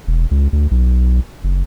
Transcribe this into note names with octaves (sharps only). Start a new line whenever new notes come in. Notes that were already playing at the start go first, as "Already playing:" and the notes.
E1
C#2
D2
B1
F#1